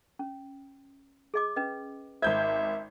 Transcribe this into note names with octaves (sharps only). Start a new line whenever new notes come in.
C#4
G#4 D#5 D6
C#4 B4 D#5
G#1 C5 E5 G6 G#6